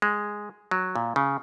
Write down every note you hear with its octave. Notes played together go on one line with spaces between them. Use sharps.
G#3
F#3
A#2
C#3